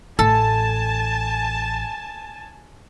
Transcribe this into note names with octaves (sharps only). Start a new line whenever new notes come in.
A1 A4 G#5 A5